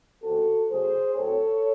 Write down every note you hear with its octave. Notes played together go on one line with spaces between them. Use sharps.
C#3 G#3 C4 F#4 A4
C#3 F#3 A3 G#4 C5
A2 F#3 C4 A4 C#5